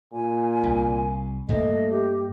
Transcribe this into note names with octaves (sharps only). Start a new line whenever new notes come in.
A#2 G#5
C2
G2 A3 A#3 D#5
G4